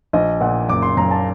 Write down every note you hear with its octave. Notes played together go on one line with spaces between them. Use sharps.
A#1 D#5
A#2 F#5
F#1 D6
C6
F#2 A#5
A5